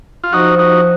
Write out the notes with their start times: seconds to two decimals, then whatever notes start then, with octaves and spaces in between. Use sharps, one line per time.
0.24 F4
0.33 F3 D#4 F#4
0.59 D#4 F#4